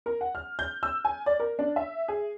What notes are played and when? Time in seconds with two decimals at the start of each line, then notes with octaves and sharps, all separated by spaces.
0.06 A#4
0.21 F#5
0.35 F6
0.59 G6
0.83 E6
1.05 G#5
1.26 D5
1.40 A#4
1.59 D4
1.76 E5
2.08 G#4